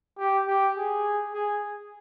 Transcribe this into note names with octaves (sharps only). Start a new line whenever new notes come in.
G4
G4
G#4
G#4